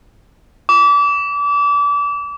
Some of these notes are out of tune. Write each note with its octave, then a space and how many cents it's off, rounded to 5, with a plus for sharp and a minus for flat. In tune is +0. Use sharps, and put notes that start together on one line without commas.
D6 -30